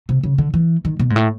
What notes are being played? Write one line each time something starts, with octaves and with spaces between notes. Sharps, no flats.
C3
C#3
D3
E3
D#3
B2
G#2
A2